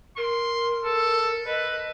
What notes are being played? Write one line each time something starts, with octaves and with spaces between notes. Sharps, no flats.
A#4 C6
A4
B4 D#5